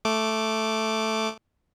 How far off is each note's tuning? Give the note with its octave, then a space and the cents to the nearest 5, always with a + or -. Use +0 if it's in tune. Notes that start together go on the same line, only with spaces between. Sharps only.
A3 +0 D6 +0